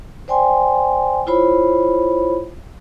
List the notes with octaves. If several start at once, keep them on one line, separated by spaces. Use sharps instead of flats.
C5 D5 G5 G#5 C6
E4 F4 C5 C#5 B5